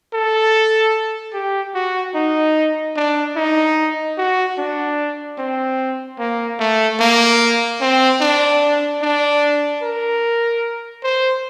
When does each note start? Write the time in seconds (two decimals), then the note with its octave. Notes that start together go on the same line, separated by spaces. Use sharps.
0.14 A4
1.34 G4
1.75 F#4
2.15 D#4
2.96 D4
3.36 D#4
4.18 F#4
4.58 D4
5.38 C4
6.19 A#3
6.60 A3
7.00 A#3
7.81 C4
8.21 D4
9.02 D4
9.82 A#4
11.04 C5